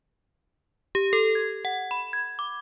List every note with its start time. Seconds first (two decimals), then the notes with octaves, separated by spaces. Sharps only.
0.95 G4
1.13 A4
1.35 G#6
1.65 F#5
1.91 B5
2.13 G#6
2.39 D6